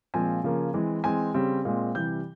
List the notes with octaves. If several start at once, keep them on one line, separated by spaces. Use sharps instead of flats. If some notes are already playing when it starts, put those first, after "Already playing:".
A#2 F3 G#3 C4 G#5
C#3 F3 A#3
E3 G#3 C4
E3 G#3 C4 G#5
C#3 G3 C4
A#2 G#3 C4
C3 E3 G3 G6